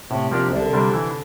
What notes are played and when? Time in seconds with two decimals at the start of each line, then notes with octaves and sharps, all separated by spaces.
0.11 A2 C3
0.31 F3 A#3 D4 G4
0.52 C2 D3
0.73 C3 G3 D4
0.94 E3